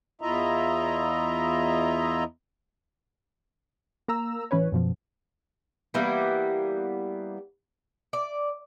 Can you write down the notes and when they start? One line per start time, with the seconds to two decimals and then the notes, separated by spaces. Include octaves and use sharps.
0.21 E2 E4 F4 D#5 E5 A#5
4.08 A#3 A#5 E6
4.51 A1 E3 C#4 B4 C#5
4.72 F#2 B2 F3
5.94 E3 G3 A#3 B3
8.13 D5